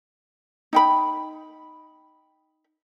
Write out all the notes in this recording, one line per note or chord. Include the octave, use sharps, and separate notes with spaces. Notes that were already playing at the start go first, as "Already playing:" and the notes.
D#4 G5 B5